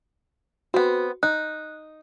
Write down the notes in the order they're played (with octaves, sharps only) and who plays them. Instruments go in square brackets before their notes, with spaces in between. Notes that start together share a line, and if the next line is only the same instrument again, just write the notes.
[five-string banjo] B3 C4 [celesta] F#4
[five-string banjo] D#4 [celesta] F#6